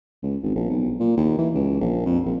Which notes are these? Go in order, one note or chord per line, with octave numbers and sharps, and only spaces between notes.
C#2
G#1
A#1
B1
A#2
D#2
E3
C#2
A#1
F2
A#1